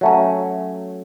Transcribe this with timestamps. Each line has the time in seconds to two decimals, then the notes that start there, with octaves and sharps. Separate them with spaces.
0.01 F#3 A3 C#4